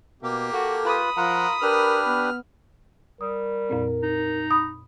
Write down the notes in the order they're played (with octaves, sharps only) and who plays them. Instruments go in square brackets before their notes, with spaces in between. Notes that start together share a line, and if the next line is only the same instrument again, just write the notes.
[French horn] B2 [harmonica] A#3 G4
[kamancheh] F#4 [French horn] A4
[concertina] F4 B4 [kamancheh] B5 D#6
[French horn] F3 [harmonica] F4 A#4 [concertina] F#5
[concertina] D4 G4 B4 [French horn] A#4 [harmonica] F6
[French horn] B3
[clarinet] G3 [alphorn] A#4 [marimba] D#6
[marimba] F2 A#2 C4
[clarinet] D#4
[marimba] B5 D#6